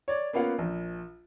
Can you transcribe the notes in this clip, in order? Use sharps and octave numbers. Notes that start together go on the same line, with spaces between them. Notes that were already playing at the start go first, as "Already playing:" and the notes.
C#5 D5
A#3 B3 C#4 F4 F5 F#5
A#1